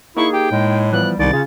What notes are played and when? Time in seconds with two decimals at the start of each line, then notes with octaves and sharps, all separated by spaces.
0.17 A#3 D#4 E4 G#4 C#6
0.33 G4 G5
0.52 A2 G#3
0.93 E3 F3 G3 B3 F#6
1.19 C2 C3 D#3 D5 A6
1.33 C#3 C#4 F4 G#4